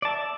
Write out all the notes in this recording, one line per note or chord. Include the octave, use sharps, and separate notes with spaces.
D5 E5 A5